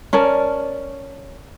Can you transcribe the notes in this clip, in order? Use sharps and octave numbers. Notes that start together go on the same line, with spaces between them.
C#4 A#4 D5 A5